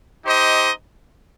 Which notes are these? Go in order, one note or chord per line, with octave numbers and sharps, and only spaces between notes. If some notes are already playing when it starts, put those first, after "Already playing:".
D#4 G4 C5 D#5